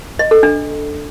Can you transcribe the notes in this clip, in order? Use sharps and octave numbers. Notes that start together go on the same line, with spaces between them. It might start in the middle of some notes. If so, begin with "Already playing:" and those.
D#5
A4
D4